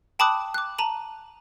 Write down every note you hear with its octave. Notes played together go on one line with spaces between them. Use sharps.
G5 A5 B5 D6 D#6 F#6
D6 F#6
A5 A#5 D#7 F#7